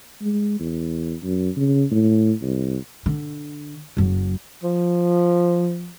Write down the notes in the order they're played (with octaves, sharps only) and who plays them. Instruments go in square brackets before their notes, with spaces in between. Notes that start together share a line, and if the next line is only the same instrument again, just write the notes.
[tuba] G#3
E2
F#2
C#3
A2
C2
[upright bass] D3
F#1 F#3
[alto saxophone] F3